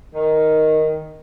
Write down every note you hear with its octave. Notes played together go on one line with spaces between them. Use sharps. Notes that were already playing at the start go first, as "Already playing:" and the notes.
D#3